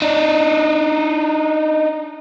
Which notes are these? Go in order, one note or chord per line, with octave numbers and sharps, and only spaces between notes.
D4 D#4